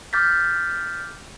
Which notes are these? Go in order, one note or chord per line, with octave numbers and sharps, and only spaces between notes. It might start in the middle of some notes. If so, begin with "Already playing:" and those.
D6 F6 G6 A6 B6